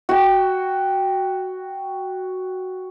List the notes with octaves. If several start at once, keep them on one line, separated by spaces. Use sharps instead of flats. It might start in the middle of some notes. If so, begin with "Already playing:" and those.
F#4 G5